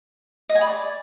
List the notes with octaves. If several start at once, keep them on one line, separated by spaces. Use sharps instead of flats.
D#5
G#5
B5
D5